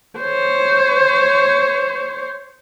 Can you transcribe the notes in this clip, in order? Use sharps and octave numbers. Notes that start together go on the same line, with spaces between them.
C5 C#5